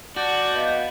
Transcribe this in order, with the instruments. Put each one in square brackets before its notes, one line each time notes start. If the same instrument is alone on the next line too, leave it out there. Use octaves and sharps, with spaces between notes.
[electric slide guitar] F#4 [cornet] D5 [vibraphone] A5 [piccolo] G6
[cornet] B3 [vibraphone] D#5 F5